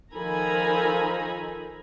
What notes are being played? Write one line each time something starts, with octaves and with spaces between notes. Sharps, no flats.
D#3 F3 A4 G#5 A#5 B5